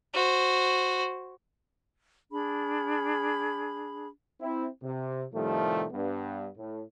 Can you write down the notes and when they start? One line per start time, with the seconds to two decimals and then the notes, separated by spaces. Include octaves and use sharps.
0.14 F#4 C5
2.32 D4 G#4 B5
4.41 C4 E4
4.83 C3
5.33 A2 C3 D#3 F3 G3 A3
5.93 G2 B3
6.57 A2